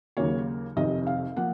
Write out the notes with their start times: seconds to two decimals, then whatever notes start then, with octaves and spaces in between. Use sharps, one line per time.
0.17 D#2 C#3 F#3 A#3 C#5
0.76 F1 F2 C3 D#3 D#5
1.07 F5
1.36 F3 A#3 F#5